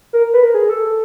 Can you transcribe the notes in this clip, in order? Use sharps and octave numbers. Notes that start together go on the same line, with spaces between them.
A#4
B4
A#4
G#4
A4